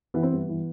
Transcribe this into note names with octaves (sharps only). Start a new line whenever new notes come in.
E3 B3
C4
G2 B3
E3